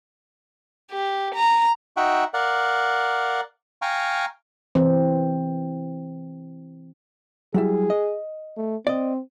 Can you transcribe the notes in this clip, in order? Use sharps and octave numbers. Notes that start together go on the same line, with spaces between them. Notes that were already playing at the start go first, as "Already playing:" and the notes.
G4
A#5
D#4 F#4 E5 F#5 G5
A#4 D5 F5 F#5
F5 G5 G#5 A#5 C#6
E3 C4
F#3 G3 E4 G#4
D#5
A3
C4 D5 D#5